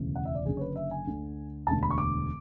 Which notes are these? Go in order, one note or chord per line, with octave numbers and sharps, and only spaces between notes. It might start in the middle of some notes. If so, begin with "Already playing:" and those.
Already playing: E1 D2 C#3 E3
F#5
E5
D5
F#1 F#2 D3 G#4
C#5
B4
E5
G#5
D2 D3
E1 D2 D3 A5
B5
C#6
D6